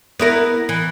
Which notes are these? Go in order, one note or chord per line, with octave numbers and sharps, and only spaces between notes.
B3 E4 A#4
E3